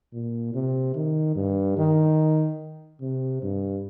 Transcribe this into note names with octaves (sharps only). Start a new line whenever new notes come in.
A#2
C3
D#3
G2
D#3
C3
G2